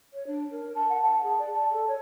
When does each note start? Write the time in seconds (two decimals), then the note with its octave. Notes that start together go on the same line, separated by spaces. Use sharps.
0.13 C#5
0.27 D4
0.51 A#4
0.75 A5
0.90 F#5
1.03 A5
1.23 G#4
1.39 D5
1.54 A5
1.73 A4
1.88 C#5